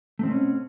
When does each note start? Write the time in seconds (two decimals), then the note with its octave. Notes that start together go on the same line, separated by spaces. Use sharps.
0.19 A3
0.23 C4
0.27 B2
0.31 C#4